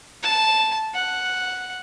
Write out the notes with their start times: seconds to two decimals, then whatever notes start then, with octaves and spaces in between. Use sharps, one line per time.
0.23 A5
0.95 F#5